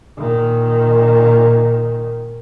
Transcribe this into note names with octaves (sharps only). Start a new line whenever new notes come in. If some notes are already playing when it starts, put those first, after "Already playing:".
A#2 D#3